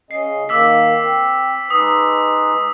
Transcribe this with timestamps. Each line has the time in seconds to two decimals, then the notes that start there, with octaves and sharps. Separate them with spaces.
0.11 C#3 C#4 D#5 C7
0.49 D#3 A#3 D6 E6 B6
0.97 C4
1.70 G#3 D#4 B4 D#6